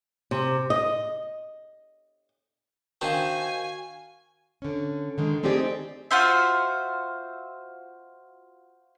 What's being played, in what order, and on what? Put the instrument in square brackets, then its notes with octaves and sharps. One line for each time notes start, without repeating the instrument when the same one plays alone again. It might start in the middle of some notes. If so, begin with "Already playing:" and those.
[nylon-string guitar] C3
D#5
[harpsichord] D#3 C4 D4 [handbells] F#4 F5 [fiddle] G#5
[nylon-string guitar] D3 C#4
D3 D#3 G#3
A3 C4 D#4 G4 G#4 D5
[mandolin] F4 F#4 C5 E5